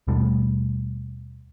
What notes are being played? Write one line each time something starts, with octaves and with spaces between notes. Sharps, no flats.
D#2 B2 G3 A3